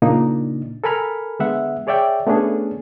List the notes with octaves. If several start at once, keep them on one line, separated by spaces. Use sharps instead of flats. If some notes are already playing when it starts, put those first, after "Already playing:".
A#2 C#3 A#3 D4 D#4
A4 A#4 G#5 B5 F6
D3 G#3 B3 E5 F#5
G#4 C#5 D5 E5 G5
A3 B3 C#4 D4 G#4 A4